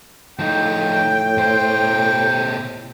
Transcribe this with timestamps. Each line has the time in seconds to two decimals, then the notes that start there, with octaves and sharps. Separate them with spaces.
0.39 A2 F3 D#4 G5
1.38 B2 C5